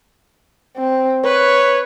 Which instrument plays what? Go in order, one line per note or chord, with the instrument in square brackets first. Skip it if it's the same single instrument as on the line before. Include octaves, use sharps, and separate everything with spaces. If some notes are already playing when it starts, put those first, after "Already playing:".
[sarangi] C4
[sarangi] B4 [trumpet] C#5